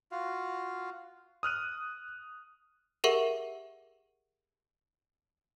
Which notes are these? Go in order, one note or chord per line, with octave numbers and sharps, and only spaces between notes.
F4 F#4 F5
D#6 F6 F#6 D#7
G4 G#4 A#4 E5 F#5 C#6